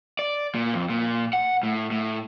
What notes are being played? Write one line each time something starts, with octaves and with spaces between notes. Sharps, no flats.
D5
A#2
F2
A#2
F#5
A2
A2